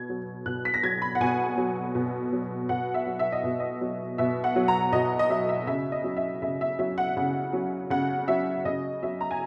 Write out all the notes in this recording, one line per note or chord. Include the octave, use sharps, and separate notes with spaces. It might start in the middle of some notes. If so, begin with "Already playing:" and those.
Already playing: B2 G#6
F#3
B2 F#6
B6
A#6
F#3 G#6
B5
F#5
B2 G#5
F#3
B2
F#3
B2 F#5
E5
F#3
E5
D#5
B2
D#5
F#3
B2 E5
F#5
F#3
A#5
B2 D#5
D#5
F#3 E5
E5
C#3 E5
D#5
F#3
E5
C#3 E5
E5
F#3 E5
F#5
C#3
F#3
C#3 F#5
F#3 E5
C#3 D#5
F#3 E5
A#5
G#5